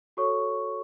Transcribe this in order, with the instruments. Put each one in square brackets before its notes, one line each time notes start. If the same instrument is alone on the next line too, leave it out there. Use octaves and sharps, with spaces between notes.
[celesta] F#4 A4 C#5 C#6